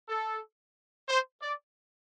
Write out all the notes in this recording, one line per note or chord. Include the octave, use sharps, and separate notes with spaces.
A4
C5
D5